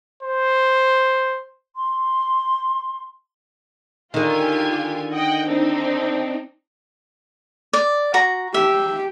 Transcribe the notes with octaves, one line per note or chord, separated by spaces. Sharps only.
C5
C6
D3 D#3 F4 G4 G#5
D#5 F#5 G5
C4 D4 D#4
D5
F#4 A#5
G4 E5